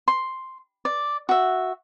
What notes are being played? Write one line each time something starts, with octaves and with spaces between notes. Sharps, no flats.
C6
D5
F#4 E5